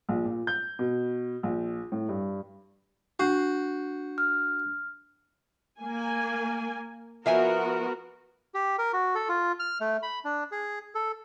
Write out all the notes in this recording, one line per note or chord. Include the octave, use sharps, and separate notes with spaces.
A#1
A#2
G6
B2
A#1
A2
G2
D4 F#4 G6 C7
F6
A#3 G#5
F3 B3 F#4 A#4 E5 G#5
G4
A#4
F#4
A4
F4
F6
A3
B5
D4
G#4
A4